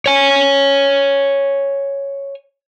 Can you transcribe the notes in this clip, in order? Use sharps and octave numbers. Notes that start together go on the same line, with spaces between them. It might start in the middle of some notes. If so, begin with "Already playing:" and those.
C#5 G#5